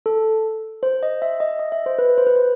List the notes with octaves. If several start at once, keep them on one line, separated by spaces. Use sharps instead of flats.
A4
C5
D#5
E5
D#5
D#5
E5
C5
B4
C5
B4
C5